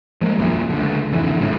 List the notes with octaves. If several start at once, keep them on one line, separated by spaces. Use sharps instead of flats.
F3 G#3 A#3
D#1 A#1 F#2 A#2
C#2 D3
D1 F2 D3 E3
G#1 C#2 A2 C#3